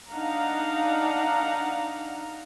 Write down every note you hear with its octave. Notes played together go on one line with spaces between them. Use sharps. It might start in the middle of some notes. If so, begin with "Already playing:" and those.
D4 D#4 F5 F#5 A#5